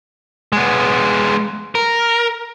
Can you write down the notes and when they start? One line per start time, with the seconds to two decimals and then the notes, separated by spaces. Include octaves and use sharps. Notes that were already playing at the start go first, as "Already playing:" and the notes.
0.53 G#3 B3
1.75 A#4